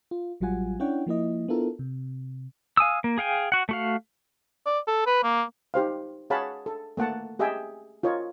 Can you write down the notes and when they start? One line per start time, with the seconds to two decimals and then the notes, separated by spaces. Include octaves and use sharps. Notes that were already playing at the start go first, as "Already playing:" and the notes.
0.11 F4
0.41 A1 F#3 G3 F4 F#5 G#5
0.80 C#4 D4 E4 C#5 F#5 G5
1.07 F3 A#3 E4 D#5
1.48 B3 D4 E4 F4 A4 A#4
1.79 C3
2.77 F5 G#5 D#6 E6
3.04 A#3
3.18 G#4 F5 G5 G#5
3.52 F#4 F#5
3.69 A3 F#4 F5
4.66 D5
4.88 A4
5.07 B4
5.23 A#3
5.74 D#4 G4 C5 F5
6.30 G#4 C#5 F5 F#5 A5 B5
6.66 A4
6.97 A3 A#3 F#5 A5
7.39 G4 G#4 D#5 E5 G5 G#5
8.03 F4 A#4 C#5 D#5